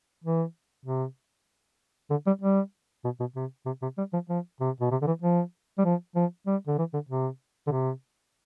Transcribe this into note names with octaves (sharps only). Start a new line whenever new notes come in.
E3
C3
D3
G3
G3
B2
B2
C3
C3
C3
G3
F3
F3
C3
B2
C3
D3
E3
F3
G3
F3
F3
G3
D3
E3
D3
C3
D3
C3